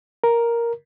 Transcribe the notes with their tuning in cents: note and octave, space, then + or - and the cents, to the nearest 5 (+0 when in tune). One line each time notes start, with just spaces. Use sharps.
A#4 +5